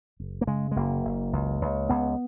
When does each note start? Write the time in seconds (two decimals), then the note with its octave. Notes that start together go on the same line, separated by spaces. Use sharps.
0.20 F#1
0.41 A#3
0.47 C#3 G#3
0.71 G#3
0.76 F#1 A#3
1.04 F#1
1.33 C#2
1.61 C#2
1.89 C#2 B3